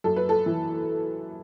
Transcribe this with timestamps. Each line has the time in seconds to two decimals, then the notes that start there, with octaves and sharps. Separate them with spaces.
0.04 F#2 A4
0.16 B4
0.29 A4
0.46 E3